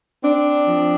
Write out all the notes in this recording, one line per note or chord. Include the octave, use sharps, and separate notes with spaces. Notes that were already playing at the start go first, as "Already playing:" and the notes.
C4 D4
F3